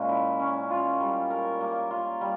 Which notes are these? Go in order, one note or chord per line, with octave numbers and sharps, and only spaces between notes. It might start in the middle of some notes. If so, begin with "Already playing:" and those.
Already playing: A#2 G#3 C#4
E4
C#4
F4
G3
A#4
A#3
F4
G3